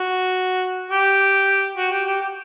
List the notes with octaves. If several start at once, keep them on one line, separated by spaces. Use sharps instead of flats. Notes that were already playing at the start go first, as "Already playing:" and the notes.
Already playing: F#4
G4
F#4
G4
G4
G4